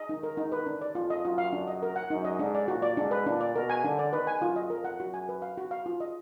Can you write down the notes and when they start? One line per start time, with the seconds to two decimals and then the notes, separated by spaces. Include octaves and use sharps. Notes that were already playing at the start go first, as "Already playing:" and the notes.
Already playing: D#5
0.09 D#3 D#4
0.23 A#4
0.37 D#4
0.52 B4
0.66 D4
0.81 D5
0.95 F2 F4
1.10 D#5
1.24 F#2 F4
1.38 F5
1.53 D4
1.68 D#5
1.83 A#4
1.96 F#5
2.10 F#2 D#4
2.25 D#5
2.39 G#2 D4
2.55 D5
2.68 A#2 F#4
2.82 D5
2.97 G#2 D4
3.11 B4
3.26 A#2 D4
3.41 D5
3.55 B2 A#4
3.70 G#5
3.84 D3 D4
3.99 D5
4.13 D#3 B4
4.27 G#5
4.42 F#2 F4
4.56 D#5
4.70 F2 A#4
4.84 F#5
5.00 F#2 F#4
5.14 G#5
5.29 B4
5.42 F5
5.57 F#4
5.71 F5
5.86 F4
6.00 D#5